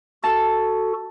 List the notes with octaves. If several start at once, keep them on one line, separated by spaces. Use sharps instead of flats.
F#4 A4 A5